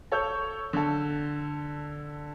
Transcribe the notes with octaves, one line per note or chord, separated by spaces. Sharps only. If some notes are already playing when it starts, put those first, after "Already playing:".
A4 C#5 E6 G6
D3 A4